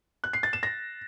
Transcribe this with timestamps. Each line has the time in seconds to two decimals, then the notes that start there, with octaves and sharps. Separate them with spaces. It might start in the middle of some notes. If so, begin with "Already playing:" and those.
0.24 F#6
0.33 C7
0.43 A6
0.53 E7
0.63 A#6